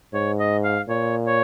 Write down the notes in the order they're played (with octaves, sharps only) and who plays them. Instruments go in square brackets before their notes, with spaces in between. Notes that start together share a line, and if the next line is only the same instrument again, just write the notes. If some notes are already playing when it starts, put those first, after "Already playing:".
[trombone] G#2 [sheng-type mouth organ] C#5
[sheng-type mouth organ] D#5
F5
[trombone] A#2 [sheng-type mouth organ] C#5
[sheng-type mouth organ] C#5